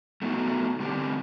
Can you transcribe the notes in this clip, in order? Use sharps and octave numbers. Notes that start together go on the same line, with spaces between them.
A3 B3 D#4 F#4
D3 G3 C4 G4